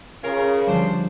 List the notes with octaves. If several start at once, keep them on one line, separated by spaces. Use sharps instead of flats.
C#3 C#4 F4 A#4
D3 F3 G3 D4 C5